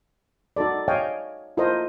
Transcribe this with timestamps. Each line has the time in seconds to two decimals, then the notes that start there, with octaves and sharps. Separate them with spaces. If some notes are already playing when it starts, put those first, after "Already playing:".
0.57 D#4 F#4 A4 D5
0.88 C#5 D#5 F5 G5 G#5
1.57 E4 F4 A4 A#4 C5 D#5